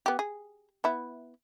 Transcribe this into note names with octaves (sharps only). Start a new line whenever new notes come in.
B3 G4
G#4
B3 E4